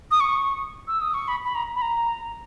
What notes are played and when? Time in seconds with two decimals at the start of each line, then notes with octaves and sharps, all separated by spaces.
0.11 D#6
0.20 C#6
0.88 E6
1.01 D#6
1.14 C#6
1.28 B5
1.45 B5
1.55 A#5
1.75 B5
1.82 A#5